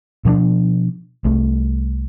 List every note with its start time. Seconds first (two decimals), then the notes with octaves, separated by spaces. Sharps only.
0.25 B2 F3 C#4 D4
1.25 C2 A3